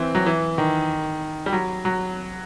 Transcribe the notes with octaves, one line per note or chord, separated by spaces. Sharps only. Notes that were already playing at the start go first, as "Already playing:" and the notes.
Already playing: E3 C4
F#3
E3
D#3
G3
F#3
F#3